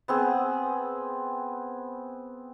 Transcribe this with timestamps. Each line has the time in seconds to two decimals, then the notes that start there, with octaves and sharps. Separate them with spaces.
0.08 B3 C4 G#4